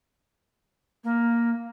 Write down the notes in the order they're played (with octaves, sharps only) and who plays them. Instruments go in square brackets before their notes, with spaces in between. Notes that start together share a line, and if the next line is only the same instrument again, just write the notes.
[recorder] A#3